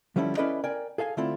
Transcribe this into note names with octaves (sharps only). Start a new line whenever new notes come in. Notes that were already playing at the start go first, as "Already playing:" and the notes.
D3 F3 G3 C#4 E4 A4
C#4 E4 A4 B4 D5 D#5
A#4 D5 G5 G#5
G#4 A4 F5 G#5
D3 A3 C4 E4 F4 A4